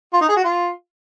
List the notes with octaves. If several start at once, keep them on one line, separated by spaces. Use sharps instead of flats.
F4
D#4
G#4
F#4
F4